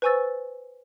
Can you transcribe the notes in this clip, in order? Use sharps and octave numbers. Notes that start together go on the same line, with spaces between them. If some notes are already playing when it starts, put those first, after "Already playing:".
B4 C5 G#5 C#6 E6 A6